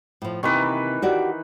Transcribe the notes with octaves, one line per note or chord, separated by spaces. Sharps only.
A2 F3
C3 D#3 E3 A#3 B4
F#4 G4 D5